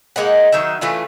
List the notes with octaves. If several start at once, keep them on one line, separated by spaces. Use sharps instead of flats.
G#3 A#3 D#4 F#5
D#3 F#3 D#4 E5
E3 A3 C#4 F4